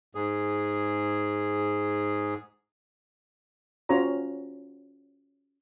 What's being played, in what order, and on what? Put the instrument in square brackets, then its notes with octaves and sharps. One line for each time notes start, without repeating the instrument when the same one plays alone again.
[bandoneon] G#2 G#4
[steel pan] C#4 F4 F#4 C5 C#5 A#5